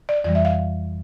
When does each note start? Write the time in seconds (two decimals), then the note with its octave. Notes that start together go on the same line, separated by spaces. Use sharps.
0.09 D5
0.24 F2 E3 G3 D5
0.35 E5
0.45 F5